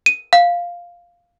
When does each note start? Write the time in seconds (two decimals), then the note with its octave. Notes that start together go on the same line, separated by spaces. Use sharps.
0.06 D#7
0.33 F5